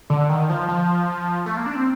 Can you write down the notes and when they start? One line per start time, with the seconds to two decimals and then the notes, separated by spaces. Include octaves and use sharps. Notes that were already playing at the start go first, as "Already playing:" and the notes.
0.10 D3
0.29 D#3
0.50 F3
0.68 F3
1.46 A3
1.57 A#3
1.66 D4
1.76 C4